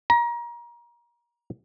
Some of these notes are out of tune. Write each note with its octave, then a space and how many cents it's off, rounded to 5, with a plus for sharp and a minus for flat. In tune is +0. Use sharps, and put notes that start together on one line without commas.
A#5 +30